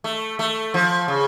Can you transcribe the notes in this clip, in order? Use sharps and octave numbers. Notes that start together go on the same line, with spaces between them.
A3
A3
F3
C#3